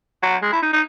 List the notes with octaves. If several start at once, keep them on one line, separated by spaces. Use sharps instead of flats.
F#3
G#3
E4
D#4
D#4